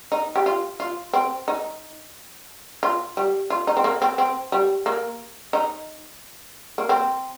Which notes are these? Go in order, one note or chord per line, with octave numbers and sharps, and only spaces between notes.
D#4
G4
F4
F4
C4
D#4
F4
G3
F4
D#4
C4
A#3
C4
C4
G3
A#3
D#4
A#3
C4